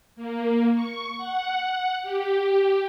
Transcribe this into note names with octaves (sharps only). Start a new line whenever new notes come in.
A#3
C#6
F#5
G4